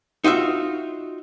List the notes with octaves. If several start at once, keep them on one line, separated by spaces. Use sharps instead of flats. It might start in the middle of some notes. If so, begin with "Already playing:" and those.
D#4 F4 F#4 E5